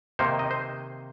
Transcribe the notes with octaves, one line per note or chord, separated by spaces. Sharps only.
C3 D#3 A#3 D#4 C5
D#5
C5